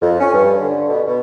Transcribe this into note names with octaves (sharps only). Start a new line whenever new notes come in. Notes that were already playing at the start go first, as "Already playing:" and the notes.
F2
C#4
G2
D3
B2
B2